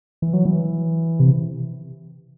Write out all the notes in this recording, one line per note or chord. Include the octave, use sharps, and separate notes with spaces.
E3
F#3
E3
C3